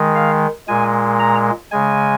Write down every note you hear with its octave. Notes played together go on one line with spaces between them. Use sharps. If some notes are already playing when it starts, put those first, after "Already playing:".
Already playing: D#3 G#3
F5
A#2 G#3 G#5
A#5
C#3 G#3 G#5